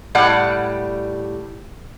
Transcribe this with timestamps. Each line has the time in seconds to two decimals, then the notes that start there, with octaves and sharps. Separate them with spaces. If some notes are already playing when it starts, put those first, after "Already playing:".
0.15 A2 G3 D5 F#5